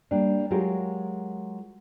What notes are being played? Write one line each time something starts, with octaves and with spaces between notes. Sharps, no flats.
G3 A#3 D4
F#3 G#3 F4 G4 A#4